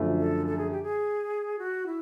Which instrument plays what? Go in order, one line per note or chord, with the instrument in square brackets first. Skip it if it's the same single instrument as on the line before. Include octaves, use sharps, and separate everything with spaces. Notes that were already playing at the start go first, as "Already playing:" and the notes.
Already playing: [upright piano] F#2 D3 F3 A3 D4
[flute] A4
A4
G#4
G4
G#4
F#4
E4